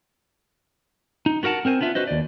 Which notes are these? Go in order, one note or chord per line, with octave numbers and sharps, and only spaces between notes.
D#4
B3 F#4 A#4 F#5 A5
C4 A#4 C5 G#5
B3 D4 F4 E5
F#4 B4 C5 D#5
D#2 D5